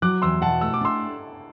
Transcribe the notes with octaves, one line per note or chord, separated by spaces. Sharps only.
F#3 D6 F#6
E2 C6 E6
B2 F#5 A5
A3 E6
D6
D4 C6 E6